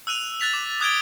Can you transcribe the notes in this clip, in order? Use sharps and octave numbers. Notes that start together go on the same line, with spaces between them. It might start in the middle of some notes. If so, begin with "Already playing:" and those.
E6 F#6 D#7 F7
F#6 A6 B6 F7
D6
D#6 F#6 G#6 A6 D7 G7